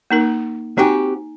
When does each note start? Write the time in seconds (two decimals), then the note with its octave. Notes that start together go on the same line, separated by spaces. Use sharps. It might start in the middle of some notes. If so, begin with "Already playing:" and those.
0.11 A#3 D#4 A#4
0.78 C4 D#4 F#4 G4 G#5